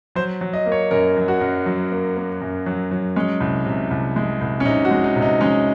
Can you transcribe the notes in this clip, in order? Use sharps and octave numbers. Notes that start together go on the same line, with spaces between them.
F#3 C5
F#3
D#5
A#3
C#5
F#2 A#4
F#3
F#4
F#2
F#3
A#3
A#3
F#2
F#3
F#3
G#3 C#4
C2
C3
C2
G#3
C2
C#4
C3 D#4
F#4
G#3
D#4
C3
D#4
G#3 C#4